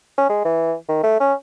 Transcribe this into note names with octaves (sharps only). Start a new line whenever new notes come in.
C#4
G#3
E3
D#3
A3
C#4